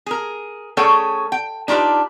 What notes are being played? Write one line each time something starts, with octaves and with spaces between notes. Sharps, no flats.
G#4 A#4
A3 C#4 G#4 A4 C#5 G5
G5
D4 D#4 F4 G4 B4